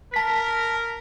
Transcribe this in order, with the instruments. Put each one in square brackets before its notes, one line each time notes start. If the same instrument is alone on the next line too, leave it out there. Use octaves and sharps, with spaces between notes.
[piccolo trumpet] A#4 [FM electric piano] A5 B6